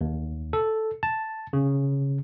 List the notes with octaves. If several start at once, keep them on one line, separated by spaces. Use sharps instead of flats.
D#2
A4
A5
C#3